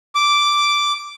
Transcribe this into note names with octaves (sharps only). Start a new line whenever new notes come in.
D6